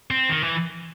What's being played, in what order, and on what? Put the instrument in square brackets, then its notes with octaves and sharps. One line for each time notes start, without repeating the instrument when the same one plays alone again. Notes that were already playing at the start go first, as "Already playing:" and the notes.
[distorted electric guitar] C4
D#3
E3